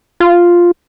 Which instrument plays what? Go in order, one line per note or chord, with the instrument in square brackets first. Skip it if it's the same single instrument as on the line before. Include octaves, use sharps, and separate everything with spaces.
[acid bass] F4